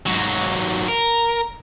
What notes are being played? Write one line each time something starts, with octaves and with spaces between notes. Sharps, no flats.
G#2 F#3
A#4